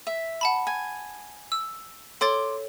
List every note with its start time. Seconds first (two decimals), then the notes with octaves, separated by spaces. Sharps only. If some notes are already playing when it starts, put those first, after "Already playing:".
0.07 E5
0.41 F#5 A5 B5
0.67 G#5
1.52 E6
2.21 A4 C#5 C6 D6 A6